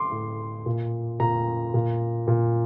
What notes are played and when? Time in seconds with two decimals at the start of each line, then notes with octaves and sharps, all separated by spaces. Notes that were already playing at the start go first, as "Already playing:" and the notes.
Already playing: C6 D6
0.11 A2
0.66 A#2
1.20 A#2 A#5
1.74 A#2
2.28 A#2